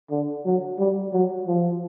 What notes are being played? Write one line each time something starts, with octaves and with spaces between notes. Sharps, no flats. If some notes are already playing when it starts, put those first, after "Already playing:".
D3
F#3
G3
F#3
F3